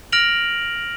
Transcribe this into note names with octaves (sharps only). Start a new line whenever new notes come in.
F6 A#6 D7 F7 F#7